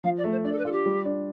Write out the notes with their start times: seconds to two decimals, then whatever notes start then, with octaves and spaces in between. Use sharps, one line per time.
0.04 F3 F5
0.18 D5
0.24 A3
0.32 C5
0.44 D4 D5
0.52 A4
0.58 B4
0.65 F4 A4
0.72 G4
0.86 G3
1.05 D4